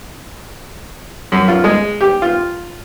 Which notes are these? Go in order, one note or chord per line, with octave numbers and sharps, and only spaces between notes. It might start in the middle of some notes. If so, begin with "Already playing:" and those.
F#2
F4
G#3
G4
F4